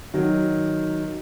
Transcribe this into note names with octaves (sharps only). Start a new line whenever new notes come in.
D#3 F#3